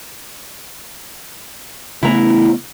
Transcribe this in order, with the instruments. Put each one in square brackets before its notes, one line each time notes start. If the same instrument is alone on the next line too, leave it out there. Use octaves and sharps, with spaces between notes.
[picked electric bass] C#3 A3 B3 [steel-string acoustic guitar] E4 A#5